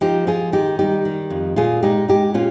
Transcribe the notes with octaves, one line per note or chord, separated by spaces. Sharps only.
F3 D#4 G4
F3 F4 G#4
D#3 D#4 G4
G3 D#4 G4
D#3
F2
A#2 F4 G#4
G#3 D#4 G4
G#3 D#4 G4
A#2 C#4 F4